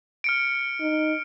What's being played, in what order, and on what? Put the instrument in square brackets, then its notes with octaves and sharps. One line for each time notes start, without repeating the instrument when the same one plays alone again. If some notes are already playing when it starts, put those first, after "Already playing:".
[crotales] F6 C#7 D7
[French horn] D#4